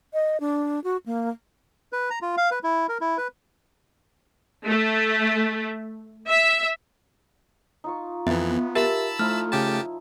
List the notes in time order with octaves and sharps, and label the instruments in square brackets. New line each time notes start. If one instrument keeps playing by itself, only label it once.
[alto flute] D#5
D4
F#4
A#3
[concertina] B4
A#5
F4
F5
B4
E4
A#4
E4
B4
[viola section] A3
E5
[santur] D#4 F4 C#6
[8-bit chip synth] F2 E3 [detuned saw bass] B3 [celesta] E5
[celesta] G4 A#4 E5 [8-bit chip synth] A5 B5 E6
[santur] F3 D#4 E4 [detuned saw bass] A3 [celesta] F6
[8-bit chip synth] C#3 G4 A5